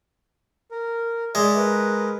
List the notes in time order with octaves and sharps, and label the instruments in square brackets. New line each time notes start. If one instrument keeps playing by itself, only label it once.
[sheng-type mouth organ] A#4
[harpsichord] G#3 [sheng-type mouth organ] D5 E5
[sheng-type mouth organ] A#4 B4